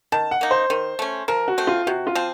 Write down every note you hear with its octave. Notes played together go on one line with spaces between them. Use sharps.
D#3 A5
F#5
A#3 D#4
C5
D#3
A3 C#4
F3 A#4
F#4
A3 C4
F4
C3 F#4
F4
F3 C4